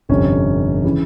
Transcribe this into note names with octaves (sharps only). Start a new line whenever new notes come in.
G1 F2 C3 C#4
C#3 E3